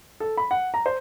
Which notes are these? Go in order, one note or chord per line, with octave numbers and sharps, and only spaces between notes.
A4
B5
F#5
A#5
C5